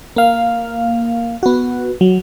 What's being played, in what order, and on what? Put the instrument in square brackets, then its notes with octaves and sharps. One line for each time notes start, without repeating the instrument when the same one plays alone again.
[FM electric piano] A#3 F5
B3 F#4
F#3